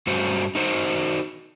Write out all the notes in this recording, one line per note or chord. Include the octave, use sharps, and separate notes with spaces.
G2 C#4 F#4 C5
D#4 F#4 C5